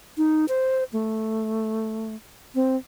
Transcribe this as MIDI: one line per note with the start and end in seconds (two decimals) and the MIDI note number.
0.17 0.45 63
0.48 0.84 72
0.93 2.15 57
2.55 2.76 60